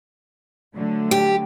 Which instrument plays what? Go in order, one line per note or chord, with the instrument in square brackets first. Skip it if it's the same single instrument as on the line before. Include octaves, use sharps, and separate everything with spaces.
[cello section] D3 F#3 A3
[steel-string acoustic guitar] G4